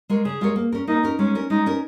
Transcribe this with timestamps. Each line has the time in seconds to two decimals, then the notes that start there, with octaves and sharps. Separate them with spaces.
0.09 G#3 F4 A#4 C#5
0.25 C#3 G#4
0.41 G#3 F4 A#4 C#5
0.56 A#3
0.72 C#4 A#4
0.87 A#3 D#4
1.03 C#4 A#4
1.19 G#3 C#4
1.35 C#4 A#4
1.50 G#3 D#4
1.66 C#4 A#4